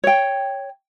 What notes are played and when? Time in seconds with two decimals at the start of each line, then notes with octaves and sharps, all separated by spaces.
0.04 C#5 G5